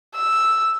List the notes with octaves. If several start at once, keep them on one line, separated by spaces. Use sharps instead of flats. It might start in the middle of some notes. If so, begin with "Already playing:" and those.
E6